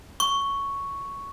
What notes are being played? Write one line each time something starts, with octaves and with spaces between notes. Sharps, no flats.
C#6